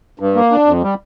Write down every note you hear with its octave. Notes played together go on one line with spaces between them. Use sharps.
G2
A#3
D4
F2
G3